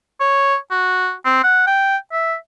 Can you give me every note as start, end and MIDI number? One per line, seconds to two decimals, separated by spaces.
0.20 0.56 73
0.71 1.13 66
1.25 1.43 60
1.44 1.66 78
1.67 1.96 79
2.12 2.35 76